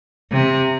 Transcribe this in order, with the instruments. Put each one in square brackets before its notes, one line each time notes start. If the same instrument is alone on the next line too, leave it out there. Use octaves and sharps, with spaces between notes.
[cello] C3